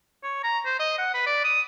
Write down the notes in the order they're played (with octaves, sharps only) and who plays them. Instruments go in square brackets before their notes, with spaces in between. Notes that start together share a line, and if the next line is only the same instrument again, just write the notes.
[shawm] C#5
A#5
C5
D#5
F#5
B4
D5
D#6